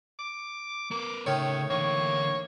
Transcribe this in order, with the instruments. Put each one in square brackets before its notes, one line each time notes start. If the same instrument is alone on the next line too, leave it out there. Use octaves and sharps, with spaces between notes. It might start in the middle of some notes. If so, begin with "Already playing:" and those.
[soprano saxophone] D6
[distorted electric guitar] B3 A#4 [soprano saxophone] D6
[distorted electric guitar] C#2 [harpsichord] A2 D#3 [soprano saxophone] C#5
[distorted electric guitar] D3 E3 [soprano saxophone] A#3 [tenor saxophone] C#5